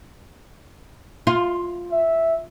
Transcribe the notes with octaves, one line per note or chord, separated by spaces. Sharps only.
F4
E5